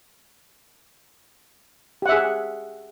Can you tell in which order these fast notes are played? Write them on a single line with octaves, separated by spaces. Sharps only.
G4 F#5 E5 G#4